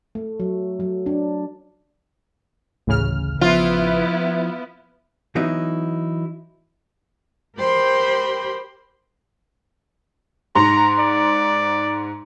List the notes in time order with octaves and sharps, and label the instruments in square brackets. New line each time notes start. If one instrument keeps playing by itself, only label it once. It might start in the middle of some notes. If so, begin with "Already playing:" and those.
[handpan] A3
F#3
F#3
D4
[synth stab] A1 C#3 F6 [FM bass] D2
[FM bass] F3 [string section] B3 E4 [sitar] F4
[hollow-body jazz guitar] E3 F#3 B3 D#4 E4
[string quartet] G4 A#4 C5 G5 B5 C6
[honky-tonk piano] G#2 C6 [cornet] A#5
[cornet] D5